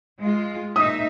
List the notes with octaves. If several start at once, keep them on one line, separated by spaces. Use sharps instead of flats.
G#3 F4
A#2 D#4 E5 D#6